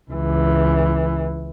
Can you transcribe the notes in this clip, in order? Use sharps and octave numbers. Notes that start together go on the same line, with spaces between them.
C#2 E3